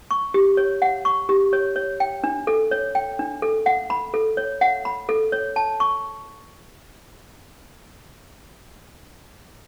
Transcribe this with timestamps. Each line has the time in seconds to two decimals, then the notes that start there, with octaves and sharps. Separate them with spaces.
0.11 C#6
0.34 G4
0.57 C#5
0.82 F#5
1.05 C#6
1.29 G4
1.53 C#5
1.76 C#5
2.00 G5
2.24 D4
2.47 A4
2.71 C#5
2.95 G5
3.19 D4
3.42 A4
3.66 F#5
3.90 B5
4.14 A4
4.37 C#5
4.61 F#5
4.85 B5
5.09 A4
5.32 C#5
5.56 A5
5.80 C#6